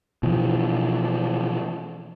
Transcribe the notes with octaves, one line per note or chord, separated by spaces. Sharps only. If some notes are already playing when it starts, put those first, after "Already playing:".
B2 E3 F3